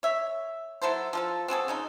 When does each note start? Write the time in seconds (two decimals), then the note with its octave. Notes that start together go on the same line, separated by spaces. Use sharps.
0.03 C#5 E5
0.82 F#3 E4 A4 C5
1.13 F3 F4 A4
1.48 C4 F#4 G#4 A4
1.68 C#3 C#4 D#4